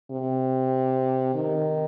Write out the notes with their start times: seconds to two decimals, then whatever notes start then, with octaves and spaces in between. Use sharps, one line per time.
0.11 C3
1.35 D#3